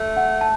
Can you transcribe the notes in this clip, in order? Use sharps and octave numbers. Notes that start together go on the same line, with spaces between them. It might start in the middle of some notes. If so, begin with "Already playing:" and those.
Already playing: A3
F#5
A5